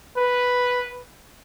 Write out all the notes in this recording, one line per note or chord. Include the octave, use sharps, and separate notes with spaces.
B4